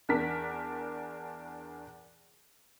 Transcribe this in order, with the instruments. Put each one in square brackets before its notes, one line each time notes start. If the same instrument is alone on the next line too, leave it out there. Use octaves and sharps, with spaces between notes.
[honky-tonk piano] E2 D4 A#4 B6